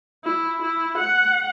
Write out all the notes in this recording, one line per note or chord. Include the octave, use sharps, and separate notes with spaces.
E4
E4
F#5